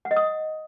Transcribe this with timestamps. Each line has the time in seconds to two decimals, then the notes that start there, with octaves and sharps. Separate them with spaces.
0.05 F#5
0.11 D#5
0.16 D#6